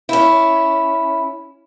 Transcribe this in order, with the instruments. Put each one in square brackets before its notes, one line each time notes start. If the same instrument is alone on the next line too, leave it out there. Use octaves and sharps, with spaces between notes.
[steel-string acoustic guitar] C#4 E4